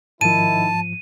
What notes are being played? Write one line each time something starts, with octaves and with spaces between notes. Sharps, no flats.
G#2 D#3 F3 E4 A5 D#7